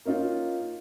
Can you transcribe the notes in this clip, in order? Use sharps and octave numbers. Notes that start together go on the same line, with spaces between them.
A#3 C#4 D#4 F4